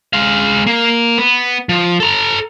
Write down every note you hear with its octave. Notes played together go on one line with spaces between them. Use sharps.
G#3 F5
A#3
B3
F3
A4 A#5